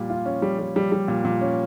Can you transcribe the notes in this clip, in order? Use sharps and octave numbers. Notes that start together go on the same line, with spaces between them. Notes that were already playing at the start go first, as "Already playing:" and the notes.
Already playing: A#2 G3
F4
C#4
G3
G3
G3
G3
A#2
A#2
C#4